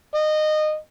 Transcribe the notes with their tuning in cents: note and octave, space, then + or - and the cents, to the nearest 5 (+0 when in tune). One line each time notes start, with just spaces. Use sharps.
D#5 -20